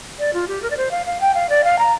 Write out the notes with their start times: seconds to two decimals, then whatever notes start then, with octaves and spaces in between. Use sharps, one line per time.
0.19 D5
0.34 F4
0.48 G4
0.63 A#4
0.71 D5
0.77 C5
0.91 F5
1.06 F5
1.21 G5
1.35 F5
1.50 D5
1.64 F5
1.79 A#5